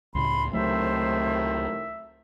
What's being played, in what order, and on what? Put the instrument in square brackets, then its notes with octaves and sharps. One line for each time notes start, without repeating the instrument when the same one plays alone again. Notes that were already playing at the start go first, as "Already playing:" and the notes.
[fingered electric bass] C#2 A2 C#3 [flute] B5 [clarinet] C6
[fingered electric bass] C#2 F#3 A3 [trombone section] A2 C3 D#3 [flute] C5 [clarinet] E5